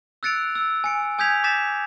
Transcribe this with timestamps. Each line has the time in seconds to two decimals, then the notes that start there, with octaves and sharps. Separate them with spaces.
0.23 E6 F#6 A6 C#7 D7 F7
0.55 E6
0.84 G#5 C#7 D7
1.19 G#5 D#6 G6 G#6 B6 F7
1.44 D6 G6 A6 B6 E7